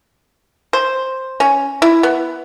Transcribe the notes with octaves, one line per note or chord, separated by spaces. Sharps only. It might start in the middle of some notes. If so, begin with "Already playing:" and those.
C5
C#4
E4
B3